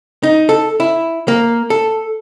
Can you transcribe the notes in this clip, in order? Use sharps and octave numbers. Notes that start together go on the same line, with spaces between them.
D#4
A4
E4
A#3
A4